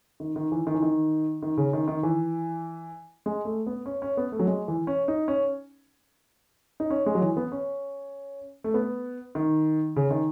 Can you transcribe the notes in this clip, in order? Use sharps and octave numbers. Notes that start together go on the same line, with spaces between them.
D#3
D#3
E3
D#3
E3
D#3
D#3
C#3
D#3
D#3
E3
G#3
A3
B3
C#4
C#4
B3
A3
F#3
G#3
E3
C#4
D#4
C#4
D#4
C#4
G#3
F#3
E3
B3
C#4
A3
B3
D#3
C#3
D#3